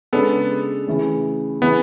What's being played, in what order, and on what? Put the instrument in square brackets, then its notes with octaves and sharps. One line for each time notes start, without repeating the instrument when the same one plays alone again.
[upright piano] C#3 G#3 D4 A4 [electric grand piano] B3
[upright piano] C#3 E3 A3
[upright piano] C#3 E3 [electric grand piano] B3